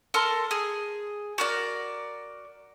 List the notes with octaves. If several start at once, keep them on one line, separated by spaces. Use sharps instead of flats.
A4 A#4 A5 C6
G#4
F#4 A#4 D5